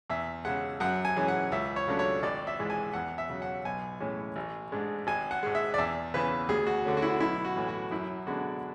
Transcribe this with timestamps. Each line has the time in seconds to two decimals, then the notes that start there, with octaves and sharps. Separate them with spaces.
0.10 E2 E5
0.45 C#3 G#3 F#5
0.80 F#2 F#5
1.05 G#5
1.16 E3 G#3 C#4
1.28 F#5
1.52 C#2 E5
1.76 C#5
1.88 C#3 F#3 A3 D4
1.99 C#5
2.23 G#1 D5
2.47 E5
2.59 G#2 E3 G#3
2.70 G#5
2.93 E2 F#5
3.18 E5
3.29 C#3 F#3
3.42 F#5
3.65 B1 G#5
4.00 A2 E3 G#3 C#4
4.36 A1
4.72 G#2 G#3 D4
5.07 G#1 G#5
5.31 F#5
5.43 G#2 G#3
5.55 E5
5.74 D5
5.78 E2 E5
6.14 C#3 E3 B3 B4
6.49 D2 G#4
6.67 F#4
6.85 D3 A3 C#4
6.97 F#4
7.02 E4
7.20 B1 E4
7.45 F#4
7.56 A2 E3 A3
7.68 F#4
7.91 F#2 E4
8.27 D3 G#3 B3 D4 F#4